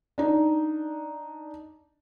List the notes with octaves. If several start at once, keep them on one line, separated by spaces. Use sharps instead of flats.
D4 D#4